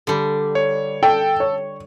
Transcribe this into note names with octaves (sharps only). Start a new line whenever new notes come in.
D3 G3
C#5
A4 G5
C#5